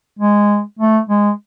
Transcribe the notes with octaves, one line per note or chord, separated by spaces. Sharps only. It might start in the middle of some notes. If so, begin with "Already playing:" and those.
G#3
A3
G#3